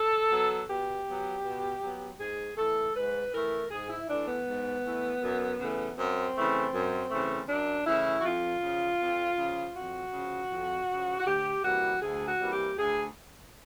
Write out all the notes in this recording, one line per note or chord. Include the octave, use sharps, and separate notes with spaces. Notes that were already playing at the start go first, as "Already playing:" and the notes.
Already playing: A4
F#3 B3
B2 G4
F#3 B3
B2
F#3 B3
G#2 G#4
E3 A3 A4
G#2 B4
E3 A3 A#4
G#2 G#4
E4
E3 A3 D4
B3
G#2
E3 A3
F#2
C#3 E3 A3
F#2 C4
C#3 E3 A3
F#2
C#3 E3 A3
F#2 D4
C#3 E3 A3 E4
F#4
F2 F4
C#3 F3
F2
C#3 F3
F2 F#4
C#3 F3
F2
C#3 F3
F#4
D2 G4
C3 E3 G3 A#3 F#4
D2 G#4
F#4
C3 E3 G3 A#3
G4
D2 G#4